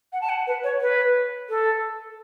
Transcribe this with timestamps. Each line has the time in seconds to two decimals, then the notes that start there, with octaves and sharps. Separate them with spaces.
0.13 F#5
0.21 A5
0.29 F#5
0.47 B4
0.64 C#5
0.81 B4
1.49 A4